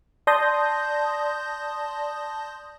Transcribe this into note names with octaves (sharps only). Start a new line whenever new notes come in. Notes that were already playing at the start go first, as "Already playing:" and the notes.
D5 A5 C6 D#6 G6 A#6